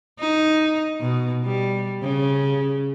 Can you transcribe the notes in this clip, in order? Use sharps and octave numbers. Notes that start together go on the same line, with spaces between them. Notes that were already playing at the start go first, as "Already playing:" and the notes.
D#4
B2
G3
C#3